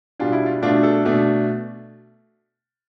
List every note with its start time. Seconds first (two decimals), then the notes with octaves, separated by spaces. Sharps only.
0.19 B2 G3 D4 F4
0.32 E4
0.46 F4
0.63 B2 A3 D4 F4
0.83 A4
1.05 B2 A3 D4